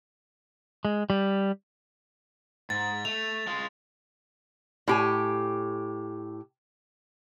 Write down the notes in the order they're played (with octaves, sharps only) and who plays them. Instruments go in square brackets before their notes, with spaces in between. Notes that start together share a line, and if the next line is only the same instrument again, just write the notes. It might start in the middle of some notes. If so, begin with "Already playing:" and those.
[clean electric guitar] G#3
G3
[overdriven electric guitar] G#2 [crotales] A6
[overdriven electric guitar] A3 [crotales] F7
[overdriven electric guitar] G#3 F4
[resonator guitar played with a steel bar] A2 G4 G#5